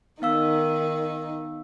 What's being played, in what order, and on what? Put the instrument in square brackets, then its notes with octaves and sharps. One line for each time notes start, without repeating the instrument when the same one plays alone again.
[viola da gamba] D#3 D#4 [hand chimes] B3 F5 E6